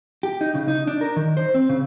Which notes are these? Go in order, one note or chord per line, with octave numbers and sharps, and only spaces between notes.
G4
D#4
C#3
D#4
D4
A#4
D#3
C5
C4
C#3